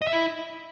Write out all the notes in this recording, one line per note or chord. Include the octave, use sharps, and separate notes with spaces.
D#5
E5
E4